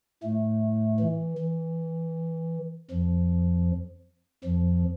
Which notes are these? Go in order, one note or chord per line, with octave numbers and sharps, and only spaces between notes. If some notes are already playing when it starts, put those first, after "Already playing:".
A2 A3
E3
E3
F2 F3
F2 F3